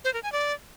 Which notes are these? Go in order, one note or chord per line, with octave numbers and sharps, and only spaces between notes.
C5
A#4
G#5
D5